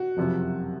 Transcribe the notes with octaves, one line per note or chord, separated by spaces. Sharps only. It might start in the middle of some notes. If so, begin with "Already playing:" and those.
Already playing: F#4
F#1 F2 C3 F3